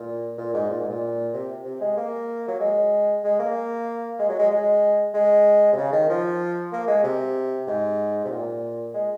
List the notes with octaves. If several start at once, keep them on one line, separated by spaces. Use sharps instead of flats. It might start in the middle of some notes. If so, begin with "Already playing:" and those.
Already playing: A#2
A#2
G#2
A#2
G#2
A#2
C3
C3
G#3
A#3
F#3
G#3
G#3
A#3
G#3
F#3
G#3
G#3
G#3
C3
C#3
D#3
F3
A#3
G#3
C3
G#2
C3
A#2
G#3